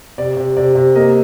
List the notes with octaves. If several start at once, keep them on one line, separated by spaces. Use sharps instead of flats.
C3 D5
C3
C3 D5
C3
A#3 D#5